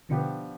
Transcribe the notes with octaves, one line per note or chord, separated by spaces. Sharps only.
B2 D3 F3 B3 D4 G4